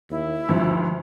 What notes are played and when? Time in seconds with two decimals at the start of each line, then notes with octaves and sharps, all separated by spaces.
0.11 D#2 E4
0.49 G#1 D2 G2 F3